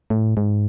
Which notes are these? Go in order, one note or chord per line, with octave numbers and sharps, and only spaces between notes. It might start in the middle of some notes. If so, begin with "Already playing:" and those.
A2
G#2